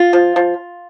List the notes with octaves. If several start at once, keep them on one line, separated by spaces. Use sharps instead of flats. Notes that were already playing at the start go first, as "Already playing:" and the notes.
Already playing: F4
F3
F3